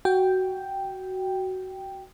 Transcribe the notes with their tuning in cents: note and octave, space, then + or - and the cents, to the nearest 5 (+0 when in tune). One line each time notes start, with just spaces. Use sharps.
F#4 +15 G5 +0